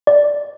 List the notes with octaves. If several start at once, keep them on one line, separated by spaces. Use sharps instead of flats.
D5